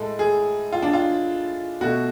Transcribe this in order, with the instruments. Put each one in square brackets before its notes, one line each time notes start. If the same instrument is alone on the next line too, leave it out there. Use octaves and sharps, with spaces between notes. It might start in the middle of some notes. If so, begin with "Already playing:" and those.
Already playing: [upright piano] A2 G#3 A4
G#4
F4
D4
F4
B2 A3 F#4